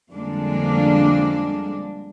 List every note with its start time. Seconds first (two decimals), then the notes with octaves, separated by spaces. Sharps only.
0.12 F2 D3 G3 G#3 A#3 D4